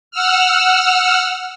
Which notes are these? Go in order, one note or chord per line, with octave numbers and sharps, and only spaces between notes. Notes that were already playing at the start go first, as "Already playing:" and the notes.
F#5 E6 F6